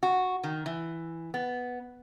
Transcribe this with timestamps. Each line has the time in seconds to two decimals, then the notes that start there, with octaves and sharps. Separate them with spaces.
0.03 F#4
0.43 D#3
0.66 E3
1.34 B3